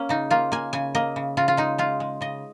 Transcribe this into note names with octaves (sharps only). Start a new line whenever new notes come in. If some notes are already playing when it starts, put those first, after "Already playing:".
Already playing: A#3 C#4
C#3 D#4
A#3 F4
A#3 G#5
C#3 G#5
A#3 D#5
C#3
C#3 F4
F4
G#3 D#4
G#3 F4
G#3
C#3 D#5